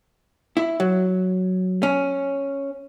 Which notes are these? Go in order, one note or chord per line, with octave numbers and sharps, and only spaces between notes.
E4
F#3
C#4